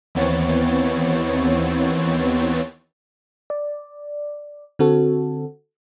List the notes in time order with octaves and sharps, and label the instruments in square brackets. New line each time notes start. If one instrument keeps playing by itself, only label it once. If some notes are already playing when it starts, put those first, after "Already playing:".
[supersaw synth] D#2 E3 B3 C4 C#5 A6
[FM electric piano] D5
D3 C4 F#4 A4